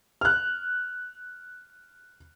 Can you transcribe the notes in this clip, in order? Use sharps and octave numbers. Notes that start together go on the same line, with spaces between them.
F6 F#6